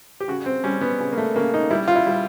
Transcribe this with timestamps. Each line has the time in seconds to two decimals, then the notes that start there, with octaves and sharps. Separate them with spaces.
0.20 G4
0.28 C#3 F#4
0.46 C4
0.64 G3 C#4
0.81 B3
1.00 C#3
1.13 A#3
1.18 A3
1.36 C#3 A#3
1.54 D#4
1.71 G3 E4
1.88 F4
1.95 E4
2.07 G3